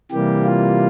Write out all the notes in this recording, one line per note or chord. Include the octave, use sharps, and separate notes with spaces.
C3 E3 G3 A#3 G4
F4